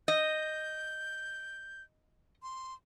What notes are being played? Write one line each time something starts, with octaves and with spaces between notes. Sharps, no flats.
D#5 G6
C6